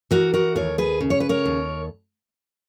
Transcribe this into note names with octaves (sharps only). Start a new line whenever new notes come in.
E3 F#4 A#4
F#4 A#4
D#2 A#4 C#5
G#4 B4
C#3
C#5
B4
A#4 C#5
D#2